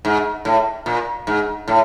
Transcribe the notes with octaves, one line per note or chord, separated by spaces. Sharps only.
G#2
A2
A#2
G#2
A2